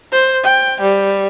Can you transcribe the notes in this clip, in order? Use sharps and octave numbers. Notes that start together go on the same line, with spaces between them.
C5
G5
G3